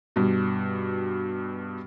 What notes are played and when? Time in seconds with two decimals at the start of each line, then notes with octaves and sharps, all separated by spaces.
0.16 G2 B2